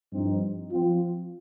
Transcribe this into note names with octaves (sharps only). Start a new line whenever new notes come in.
G2 F3 C4 D#4
F3 C4 F4